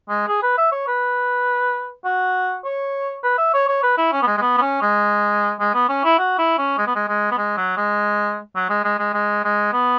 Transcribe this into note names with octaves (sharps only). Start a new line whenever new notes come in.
G#3
G#4
B4
E5
C#5
B4
F#4
C#5
B4
E5
C#5
C#5
B4
E4
C#4
B3
G#3
G#3
B3
B3
C#4
G#3
G#3
B3
C#4
E4
F#4
E4
C#4
G#3
B3
G#3
G#3
B3
G#3
F#3
G#3
F#3
G#3
G#3
G#3
G#3
G#3
B3